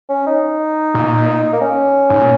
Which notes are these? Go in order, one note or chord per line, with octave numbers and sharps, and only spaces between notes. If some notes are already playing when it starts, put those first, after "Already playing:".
C#4
D#4
A#2
A#3
C#4
G#2
A#2